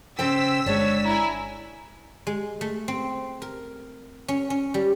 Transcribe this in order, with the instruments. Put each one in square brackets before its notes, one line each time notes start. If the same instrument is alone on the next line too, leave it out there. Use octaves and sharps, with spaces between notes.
[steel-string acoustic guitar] C#3 C5 G5 [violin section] E6 B6
[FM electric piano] G1 G#3 [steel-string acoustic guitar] D4 [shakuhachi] C#5
[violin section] E4 E5 G#5 [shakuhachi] A#5
[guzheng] G#3
A3
C4
A#4
C#4
C#4
G3